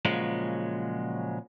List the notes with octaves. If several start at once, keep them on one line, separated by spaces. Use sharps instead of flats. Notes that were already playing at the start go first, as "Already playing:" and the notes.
A#2 C#3 F3 F#3 G#3